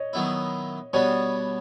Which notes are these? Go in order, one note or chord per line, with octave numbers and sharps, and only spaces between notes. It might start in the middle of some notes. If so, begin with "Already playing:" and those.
Already playing: C#5 D#5
D#3 F#3 B3 E4
B2 G3 B3 D4 C#5